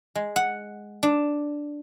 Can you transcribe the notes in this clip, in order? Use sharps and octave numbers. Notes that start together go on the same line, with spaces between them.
G#3
F#5
D4